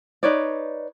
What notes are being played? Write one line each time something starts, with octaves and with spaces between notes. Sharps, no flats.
D#4 B4 C#5 D5